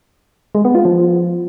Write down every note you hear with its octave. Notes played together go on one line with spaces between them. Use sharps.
G#3
B3
F4
F3